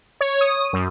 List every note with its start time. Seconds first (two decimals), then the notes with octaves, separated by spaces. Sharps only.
0.21 C#5
0.41 D#6
0.73 F#2